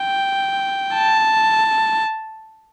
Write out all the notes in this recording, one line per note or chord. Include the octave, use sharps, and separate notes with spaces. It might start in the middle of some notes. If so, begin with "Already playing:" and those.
Already playing: G5
A5